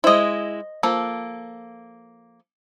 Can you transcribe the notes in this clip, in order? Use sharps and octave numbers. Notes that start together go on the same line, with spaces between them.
G#3 E4 C5 D#5
F3 A#3 A4